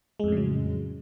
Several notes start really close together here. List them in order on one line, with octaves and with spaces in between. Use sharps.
G#3 F2 A2 C#3 F#3